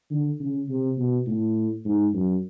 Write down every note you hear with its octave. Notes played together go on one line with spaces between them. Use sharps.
D3
C#3
C3
B2
A2
G#2
F#2